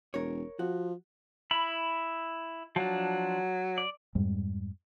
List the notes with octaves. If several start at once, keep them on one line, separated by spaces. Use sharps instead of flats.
E1 A#4 C#5
F3 F#4
E4 B5
F3 F#3 D4
D5
F2 G#2 G3 G#3